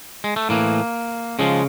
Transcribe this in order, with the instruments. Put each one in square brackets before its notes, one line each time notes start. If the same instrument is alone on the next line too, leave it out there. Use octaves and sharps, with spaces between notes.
[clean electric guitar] G#3
A3
A2 E3 A#3
C#3 F3 G#3